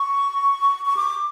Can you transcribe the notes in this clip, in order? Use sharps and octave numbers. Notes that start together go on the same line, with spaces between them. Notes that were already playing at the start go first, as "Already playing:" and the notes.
Already playing: C#6
C#6
D6